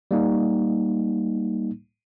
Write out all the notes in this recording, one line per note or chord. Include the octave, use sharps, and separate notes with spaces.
G3 A#3 D#4